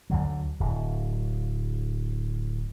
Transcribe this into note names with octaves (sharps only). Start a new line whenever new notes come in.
D2 D3 F#3
D1